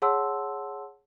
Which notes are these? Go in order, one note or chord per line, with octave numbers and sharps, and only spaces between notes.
G#4 C#5 F#5 A5 C6 E6